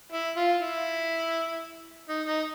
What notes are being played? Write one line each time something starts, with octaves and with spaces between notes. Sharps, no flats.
E4
F4
E4
D#4
D#4